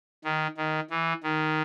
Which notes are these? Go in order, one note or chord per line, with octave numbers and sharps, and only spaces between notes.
D#3
D#3
E3
D#3